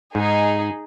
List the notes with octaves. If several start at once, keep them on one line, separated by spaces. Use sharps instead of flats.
G#2 D#4 G#4